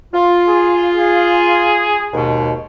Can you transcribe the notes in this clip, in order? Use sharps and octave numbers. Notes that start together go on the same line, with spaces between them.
F4
G#4
G#4
D#2 G#2 B2